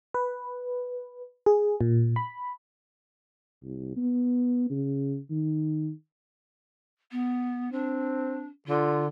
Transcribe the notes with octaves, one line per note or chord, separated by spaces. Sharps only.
B4
G#4
A#2
B5
C2
B3
C#3
D#3
B3
C4 D4
D3 F4